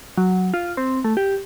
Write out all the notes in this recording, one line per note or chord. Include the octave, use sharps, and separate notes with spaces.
F#3
F4
C4
A3
G4